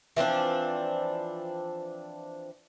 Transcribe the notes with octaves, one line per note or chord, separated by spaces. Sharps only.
E3 F3 C4 D4